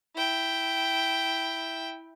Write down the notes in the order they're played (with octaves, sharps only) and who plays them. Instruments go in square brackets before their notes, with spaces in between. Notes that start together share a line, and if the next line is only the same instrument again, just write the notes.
[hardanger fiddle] E4 G5